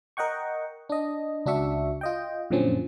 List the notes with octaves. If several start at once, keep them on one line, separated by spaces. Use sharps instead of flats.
A#4 D#5 F#5 G5 C#6
D4 D#5
C#2 D4 F#4 E5 C#6
F4 D#5 G5
F#2 A#2 D3 F3 C4 C#4